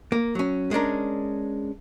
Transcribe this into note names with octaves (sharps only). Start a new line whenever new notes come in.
A#3
F#3 C#4
G#3 C#4 D4 A#4